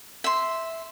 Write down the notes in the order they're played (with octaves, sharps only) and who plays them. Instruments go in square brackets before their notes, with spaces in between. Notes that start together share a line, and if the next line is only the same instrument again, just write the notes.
[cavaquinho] E5 C6